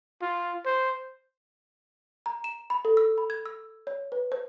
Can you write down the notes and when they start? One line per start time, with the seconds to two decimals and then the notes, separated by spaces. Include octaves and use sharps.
0.22 F4
0.65 C5
2.26 A#5
2.44 E7
2.70 B5
2.85 A4
2.97 E6
3.18 B5
3.30 G#6
3.46 E6
3.87 C#5
4.12 B4
4.32 C5